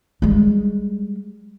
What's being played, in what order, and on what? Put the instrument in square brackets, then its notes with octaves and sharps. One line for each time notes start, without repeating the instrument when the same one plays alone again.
[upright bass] G3 G#3